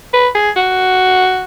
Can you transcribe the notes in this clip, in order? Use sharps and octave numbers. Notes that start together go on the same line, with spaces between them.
B4
G#4
F#4